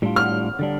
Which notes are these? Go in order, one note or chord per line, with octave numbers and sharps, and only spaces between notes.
A2 G3 D4 F4
F6
D3 G3 D4